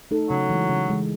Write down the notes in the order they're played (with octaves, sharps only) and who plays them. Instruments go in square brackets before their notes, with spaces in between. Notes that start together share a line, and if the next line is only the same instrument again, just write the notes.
[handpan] A3 D#4 A4
[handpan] C#3 [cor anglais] F#3
[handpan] E3 G#3
C#3
E3 G#3